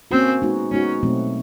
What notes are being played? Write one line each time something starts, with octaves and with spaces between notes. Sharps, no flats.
A#3 C4 C#4 F#4
G#3 B3 D#4 F#4
G#3 B3 C#4 D#4 F#4
B2 F#3 A3 C4